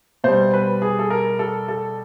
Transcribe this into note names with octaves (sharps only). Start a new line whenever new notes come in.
B2 G3 C5
B4
G#4
A4
A#4
A4
A4